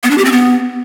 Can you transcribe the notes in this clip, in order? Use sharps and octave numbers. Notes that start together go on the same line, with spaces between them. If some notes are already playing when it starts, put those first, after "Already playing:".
B3
D4
G4
C4
B3